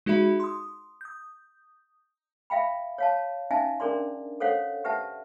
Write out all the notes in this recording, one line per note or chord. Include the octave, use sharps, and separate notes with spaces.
G#3 D#4 F#4 G#4 E5 B5
C6 D#6
D#6 G6
E5 F5 G5 B5
C#5 F5 A5
C#4 D#4 E5 F5 G#5 A5
C#4 D4 G#4 A#4 D5 C6
A4 C5 C#5 F5 F#5
G4 B4 E5 F#5 A5